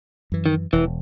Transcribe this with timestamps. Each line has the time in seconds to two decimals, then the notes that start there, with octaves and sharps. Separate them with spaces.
0.32 F#2 E3
0.46 D#3
0.73 E1 E3